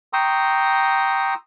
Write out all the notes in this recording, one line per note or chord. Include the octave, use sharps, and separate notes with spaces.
G5 A#5 C6 C#6 D#6 E6